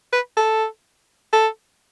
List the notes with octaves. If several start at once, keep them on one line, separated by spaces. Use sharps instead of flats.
B4
A4
A4